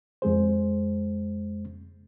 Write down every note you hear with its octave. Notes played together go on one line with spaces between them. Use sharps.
F2 G#3 G#4 C5